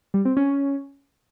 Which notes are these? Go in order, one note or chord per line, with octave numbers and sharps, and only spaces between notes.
G3
C4
C#4